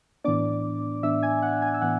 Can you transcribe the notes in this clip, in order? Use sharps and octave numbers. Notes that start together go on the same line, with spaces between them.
A2 E3 B3 D4 D5 D6
A2 E3 B3 D4 E5 E6
G#5 G#6
F#5 F#6
G#5 G#6
E6
A2 E3 B3 F#5 F#6